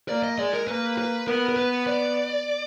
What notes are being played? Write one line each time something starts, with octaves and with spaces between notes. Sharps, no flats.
A#3 D5
D#5
G#3 D5
A#4
A#3 B4
B4
B3 A#4
A#4
B4
D5